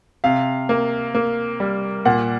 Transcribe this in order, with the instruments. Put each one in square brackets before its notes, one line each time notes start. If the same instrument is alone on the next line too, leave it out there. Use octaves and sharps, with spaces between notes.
[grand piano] C3 F5
A#3
A#3
G3
A#2 F#5